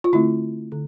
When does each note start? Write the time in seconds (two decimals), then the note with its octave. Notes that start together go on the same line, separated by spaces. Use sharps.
0.04 F4
0.13 D3 A3 C4 E4
0.72 D3